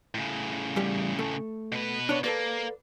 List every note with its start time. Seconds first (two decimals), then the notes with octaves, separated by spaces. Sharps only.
0.14 A2 C#3
0.76 E2 G3 G4
1.19 A3 A4
1.72 B2 B4
2.09 D4 C#5
2.24 A#3 A4 B4 D5